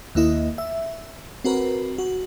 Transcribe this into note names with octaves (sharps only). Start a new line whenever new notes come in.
D#2 A#3 E4 D#5
E5
C4 F#4 A#4 B4
F#4